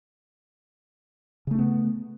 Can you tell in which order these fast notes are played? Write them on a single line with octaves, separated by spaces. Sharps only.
C#3 A3 D4 B3